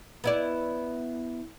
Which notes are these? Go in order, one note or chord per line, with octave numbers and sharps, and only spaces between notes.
B3 E4 D5